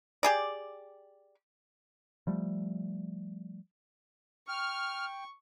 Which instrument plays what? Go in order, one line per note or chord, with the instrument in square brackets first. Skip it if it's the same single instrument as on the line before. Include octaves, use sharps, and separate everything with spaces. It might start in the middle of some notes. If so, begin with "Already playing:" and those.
[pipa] G4 G#4 D5
[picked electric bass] F3 G3 A3
[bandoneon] G5 [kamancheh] C#6 [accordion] F6